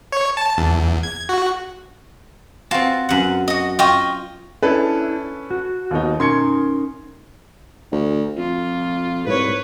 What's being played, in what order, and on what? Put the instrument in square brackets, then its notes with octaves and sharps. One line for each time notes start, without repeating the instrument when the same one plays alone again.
[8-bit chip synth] C#5
A5
E2
G#6
F#4
[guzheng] C4 A5 [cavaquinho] F4 F#4
[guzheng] F#2 F#5
[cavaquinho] F#4 D#5
[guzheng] F4 [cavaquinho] D#5 G5 C#6
[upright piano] C#4 A4 B4 [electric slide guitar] D4 E4
[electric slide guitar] F#4
[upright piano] D#2 B3 D#4
[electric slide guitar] C#4 D#4 A#4 [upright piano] C6 G#6 C#7
[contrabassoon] D2
[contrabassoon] F2 [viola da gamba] F4
[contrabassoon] C2 [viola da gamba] G#2 B4 C#5